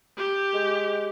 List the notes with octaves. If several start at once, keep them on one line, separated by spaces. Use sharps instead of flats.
G4
G#3